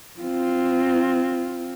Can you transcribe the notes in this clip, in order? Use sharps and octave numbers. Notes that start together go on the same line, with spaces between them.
C4 F4